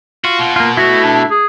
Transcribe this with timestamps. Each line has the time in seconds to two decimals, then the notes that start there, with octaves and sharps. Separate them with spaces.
0.24 F4 F#4
0.39 B2
0.56 A#3 F4
0.77 A3 E4 F#4
1.04 D4
1.30 G#4